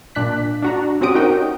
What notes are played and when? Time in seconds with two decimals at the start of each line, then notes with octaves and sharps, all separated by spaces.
0.15 A#2 D4 F#6 B6
0.62 D4 F#4 A#5
1.01 C4 C#4 F#4 G4 D#6 D7
1.15 D#4 F#4 G4 A#4 G5